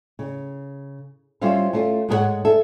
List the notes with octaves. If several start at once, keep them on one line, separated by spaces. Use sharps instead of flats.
C#3
G3 C#4 F4 C5 E5 F5
A3 C#4 F4
G#2 F#4 G#4 A#4 C#5 F#5
G#4 A4 E5